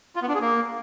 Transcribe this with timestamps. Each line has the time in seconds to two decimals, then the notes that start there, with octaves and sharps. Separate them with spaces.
0.16 F4
0.22 B3
0.28 D4
0.35 G#4
0.41 A#3